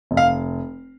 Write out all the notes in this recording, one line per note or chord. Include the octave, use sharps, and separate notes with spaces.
F1
F5